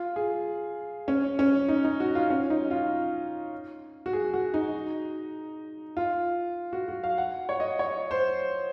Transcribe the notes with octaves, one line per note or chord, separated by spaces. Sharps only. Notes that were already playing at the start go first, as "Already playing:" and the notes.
Already playing: F4
G#4
C#4
C#4
D#4
D#4
F#4
F4
C#4
D#4
F4
F#4
G#4
F#4
D#4
F4
F#4
F#4
F5
F#5
C#5
D#5
C#5
C5